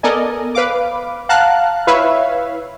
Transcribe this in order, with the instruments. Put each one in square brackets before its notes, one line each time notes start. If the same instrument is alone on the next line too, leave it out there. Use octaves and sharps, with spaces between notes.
[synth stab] B3 A4 A#4 D5 D#5 G#5
B4 F5 D6
F5 F#5 A5 A#5 F6 F#6
E4 B4 C#5 E5 F5